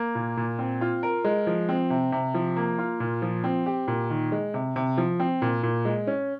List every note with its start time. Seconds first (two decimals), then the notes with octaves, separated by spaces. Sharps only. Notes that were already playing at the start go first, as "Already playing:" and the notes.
Already playing: A#3
0.15 A#2
0.37 A#2
0.59 C4
0.81 F4
1.03 A#4
1.25 G#3
1.47 F3
1.69 C4
1.90 C3
2.12 C3
2.34 F3
2.56 A#3
2.78 F4
3.00 A#2
3.22 F3
3.44 C4
3.66 G4
3.88 A#2
4.10 D#3
4.32 G#3
4.54 C3
4.76 C3
4.98 F3
5.20 C4
5.42 A#2
5.63 A#2
5.85 G#3
6.07 C#4